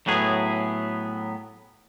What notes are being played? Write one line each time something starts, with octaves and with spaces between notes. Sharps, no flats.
A2 F#3 B3 G#4